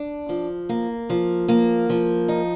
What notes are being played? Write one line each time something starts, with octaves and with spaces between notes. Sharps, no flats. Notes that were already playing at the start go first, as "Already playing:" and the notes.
Already playing: D4
F3
A#3
F3
A#3
F3
D#4